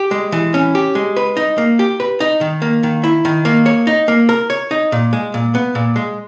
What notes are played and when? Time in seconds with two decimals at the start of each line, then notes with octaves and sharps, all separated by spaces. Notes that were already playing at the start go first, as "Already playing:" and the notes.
Already playing: G4
0.11 G#3
0.32 E3
0.54 C#4
0.75 G4
0.95 G#3
1.16 B4
1.37 D#4
1.58 A#3
1.79 G4
2.00 B4
2.20 D#4
2.41 D#3
2.62 A#3
2.83 D#3
3.04 E4
3.25 D#3
3.45 A#3
3.66 C#5
3.87 D#4
4.08 A#3
4.29 A#4
4.50 C#5
4.71 D#4
4.92 A#2
5.13 G#3
5.34 A#2
5.55 B3
5.75 A#2
5.96 G#3